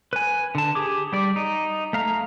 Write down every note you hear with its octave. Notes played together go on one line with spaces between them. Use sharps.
B4 G#5
D3 A5
G4 G#4 D6
G3 D5
D#4
A3 F5 A#5